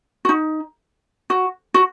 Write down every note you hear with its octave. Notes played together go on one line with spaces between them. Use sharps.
F#4
D#4
F#4
F#4